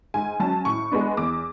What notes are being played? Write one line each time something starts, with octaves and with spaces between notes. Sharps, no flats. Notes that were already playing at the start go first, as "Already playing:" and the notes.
G#2 G#5
F#3 C#4 A5
A2 C#6
G#3 B3 D4
E2 D6